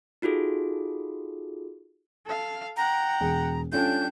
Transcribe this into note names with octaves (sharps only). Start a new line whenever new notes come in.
D#4 F4 F#4 G#4 A4
A4 F5
F#5 G5 A#5
E1 G#4
G3 C#4 D4 F4 A4 G6